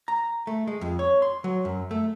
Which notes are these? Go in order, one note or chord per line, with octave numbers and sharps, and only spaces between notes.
A#5
A3
G#3
F2
C#5
C6
F#3
F#2
A3